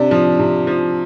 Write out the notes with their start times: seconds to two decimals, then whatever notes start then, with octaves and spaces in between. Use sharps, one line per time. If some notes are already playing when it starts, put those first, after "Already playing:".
Already playing: C3 D4
0.11 F3
0.39 C3
0.67 F3